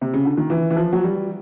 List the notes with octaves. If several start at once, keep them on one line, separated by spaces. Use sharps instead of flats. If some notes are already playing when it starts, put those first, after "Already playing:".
C3
C#3
D3
D#3
E3
E3
F3
F#3
G3